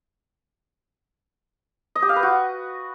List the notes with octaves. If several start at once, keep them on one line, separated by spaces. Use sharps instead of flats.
D#5
G4
F5
B4
F#4